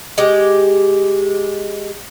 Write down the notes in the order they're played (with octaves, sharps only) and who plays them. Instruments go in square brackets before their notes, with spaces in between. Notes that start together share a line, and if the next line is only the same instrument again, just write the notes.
[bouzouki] G#3 G4